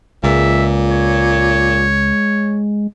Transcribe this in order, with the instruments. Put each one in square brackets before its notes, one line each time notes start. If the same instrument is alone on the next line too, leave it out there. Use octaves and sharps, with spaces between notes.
[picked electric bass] C#2 [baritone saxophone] A#2 [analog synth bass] G#3 [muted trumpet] E5
[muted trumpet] C#5